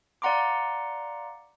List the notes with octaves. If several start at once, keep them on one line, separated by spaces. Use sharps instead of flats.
D5 F5 F#5 A#5 C6 D6